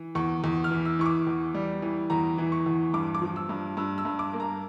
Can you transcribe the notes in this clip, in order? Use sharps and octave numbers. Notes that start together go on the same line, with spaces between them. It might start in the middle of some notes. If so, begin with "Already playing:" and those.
Already playing: E3
E2 C#6
E2
F6
E3
E6
E3 C#6
D6
E2
G3
E3
E2 A#5
E3
C#6
E2
G2 D6
D6
F3
E6
G2
G2 E6
E6
G2
D6
A#3
A#5